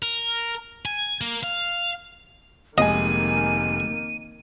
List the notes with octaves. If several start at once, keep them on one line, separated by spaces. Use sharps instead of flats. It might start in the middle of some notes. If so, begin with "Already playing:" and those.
A#4
G#5
A#3
F5
F1 D#3 G#3 A#3 D#5 G#5 D#7